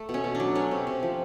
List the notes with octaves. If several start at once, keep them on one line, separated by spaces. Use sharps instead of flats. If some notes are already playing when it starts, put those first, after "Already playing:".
Already playing: A3
B2
C#4
B2
D4
F#3
A3 C#4
C3
C3
F3